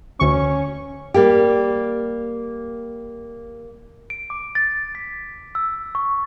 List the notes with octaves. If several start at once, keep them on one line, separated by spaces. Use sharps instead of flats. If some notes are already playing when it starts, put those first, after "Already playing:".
D2 C#4 C#6
G3 A#3 G4
D7
D6
A6
B6
E6
C#6